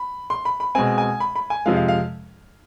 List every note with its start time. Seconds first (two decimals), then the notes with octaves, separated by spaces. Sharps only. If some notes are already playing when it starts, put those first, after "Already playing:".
Already playing: B5
0.30 C6
0.45 B5
0.60 B5
0.75 B2 G#3 C4 G#5
0.98 G#5
1.20 B5
1.36 B5
1.50 G#5
1.66 F2 C3 F3 G#3 F5
1.76 F5
1.88 F5